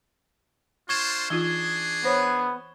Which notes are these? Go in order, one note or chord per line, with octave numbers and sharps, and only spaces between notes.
D4 F4 C5 C#6 G#6 E7
E3 D4 D#4 F4 G#4 G7
B3 C5 C#5